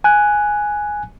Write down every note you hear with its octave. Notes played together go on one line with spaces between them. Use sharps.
G#5 F#6